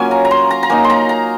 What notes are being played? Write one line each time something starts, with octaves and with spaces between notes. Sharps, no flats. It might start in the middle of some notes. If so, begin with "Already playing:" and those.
Already playing: F#3 A#3 C#4 F4 G#5
A#5
A#5
C6
A#5
A#5
A#3 D#4 G#5
C6
A#5
A#5